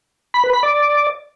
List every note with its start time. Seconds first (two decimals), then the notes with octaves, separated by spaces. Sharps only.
0.34 B5
0.44 B4
0.53 B5
0.63 D5